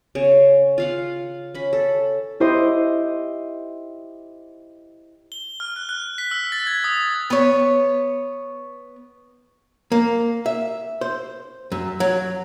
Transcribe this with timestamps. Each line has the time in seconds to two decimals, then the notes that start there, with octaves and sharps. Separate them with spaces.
0.15 C#3 C#5
0.78 F4 F5 F#5
1.54 C#4 B5
1.73 A4
2.40 E4 G4 C5 D#5
5.32 G7
5.60 F6
5.76 F#6
5.89 F#6
6.18 B6
6.31 E6
6.52 A6
6.67 G#6
6.84 D#6
7.30 B3 C#5
9.92 A#3
10.46 E5
11.01 C5
11.72 F#2
12.00 F#3